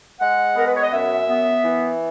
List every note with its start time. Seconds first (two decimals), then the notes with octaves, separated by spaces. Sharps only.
0.20 G#3 F#5
0.56 B3 A#4
0.66 B4
0.75 C#5
0.83 D#5
0.92 F#2 E5
1.28 B3
1.63 E3